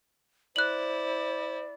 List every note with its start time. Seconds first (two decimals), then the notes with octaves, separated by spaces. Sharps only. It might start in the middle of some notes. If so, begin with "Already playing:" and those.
0.56 E4 C5 D5 F#6 F#7